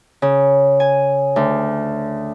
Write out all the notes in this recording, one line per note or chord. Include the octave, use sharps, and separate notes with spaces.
C#3
G#5
D2